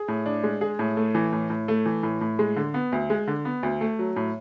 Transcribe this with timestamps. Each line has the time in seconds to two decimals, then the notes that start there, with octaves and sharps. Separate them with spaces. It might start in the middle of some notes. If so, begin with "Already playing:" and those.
Already playing: G#4
0.08 A2
0.26 D4
0.43 G#3
0.61 G#4
0.79 A2
0.97 A3
1.15 E3
1.32 A2
1.50 A2
1.68 A3
1.86 E3
2.03 A2
2.21 A2
2.39 G#3
2.56 D3
2.74 B3
2.92 D2
3.10 G#3
3.28 D3
3.45 B3
3.63 D2
3.81 A3
3.99 F#3
4.16 A2